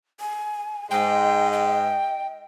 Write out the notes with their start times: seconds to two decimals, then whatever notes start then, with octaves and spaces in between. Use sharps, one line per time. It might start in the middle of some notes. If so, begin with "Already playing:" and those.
0.20 G#5
0.91 G#2 G#3 D#5 G5
1.53 G5